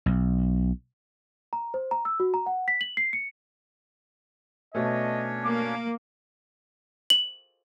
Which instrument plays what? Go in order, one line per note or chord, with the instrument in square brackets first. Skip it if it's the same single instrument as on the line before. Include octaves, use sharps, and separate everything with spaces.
[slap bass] B1
[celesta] A#5
C5
A#5
E6
F#4
A#5
F#5
B6
F#7
C7
C#7
[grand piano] B2 A3 [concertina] C#4 D4 C#5 [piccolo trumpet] D#5
[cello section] A#3 [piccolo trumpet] D6
[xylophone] F#7